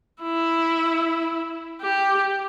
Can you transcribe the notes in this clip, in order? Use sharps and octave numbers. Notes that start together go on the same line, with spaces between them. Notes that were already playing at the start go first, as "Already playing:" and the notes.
E4
G4